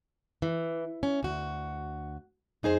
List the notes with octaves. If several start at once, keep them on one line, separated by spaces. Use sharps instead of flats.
E3
C#4
D2 F#4
F2 D#4 G#4 C5